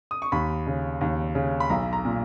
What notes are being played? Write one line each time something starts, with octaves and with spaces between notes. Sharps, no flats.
D#6
C#6
D#2 B5
C#3
D#2
C#3
B5
B1 A#5
A#5
A#2